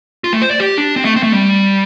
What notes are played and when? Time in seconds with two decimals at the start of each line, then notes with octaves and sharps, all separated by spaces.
0.24 F4
0.33 A3
0.42 C5
0.51 D5
0.60 G4
0.78 D4
0.96 C4
1.05 A3
1.16 C4
1.23 A3
1.33 G3